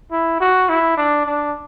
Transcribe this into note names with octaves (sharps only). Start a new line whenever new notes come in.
E4
F#4
E4
D4
D4